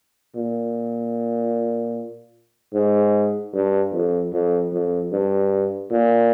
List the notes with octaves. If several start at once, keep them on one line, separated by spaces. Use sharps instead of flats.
A#2
G#2
G2
F2
F2
F2
G2
A#2